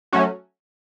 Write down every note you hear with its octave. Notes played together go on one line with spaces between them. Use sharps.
F#3 A3 C#4 F#4